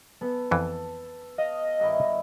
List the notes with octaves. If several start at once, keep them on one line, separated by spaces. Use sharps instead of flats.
B3 A4
F2 E3 A4
D#5 F5
G2 D#3 E4